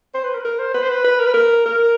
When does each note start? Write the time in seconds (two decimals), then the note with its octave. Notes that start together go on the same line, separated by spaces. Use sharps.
0.15 C5
0.24 B4
0.35 A#4
0.40 B4
0.45 A#4
0.59 C5
0.74 B4
0.82 C5
0.89 B4
1.05 B4
1.20 A#4
1.27 B4
1.34 A#4
1.66 A#4